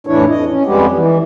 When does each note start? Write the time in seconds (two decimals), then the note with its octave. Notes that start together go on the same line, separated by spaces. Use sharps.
0.07 F2 A2 E3 D4 E4 C#5
0.29 F2 D#5
0.50 C#4
0.66 F2 G3 G#3 B3 G4
0.94 E3